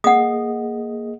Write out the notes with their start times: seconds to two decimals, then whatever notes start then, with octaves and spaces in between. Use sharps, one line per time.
0.04 A#3 G#4 D#5 F#5 D#6